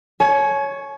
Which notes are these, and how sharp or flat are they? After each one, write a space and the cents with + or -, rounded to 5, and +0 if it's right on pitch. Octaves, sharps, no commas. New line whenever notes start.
C#5 +0 G#5 +40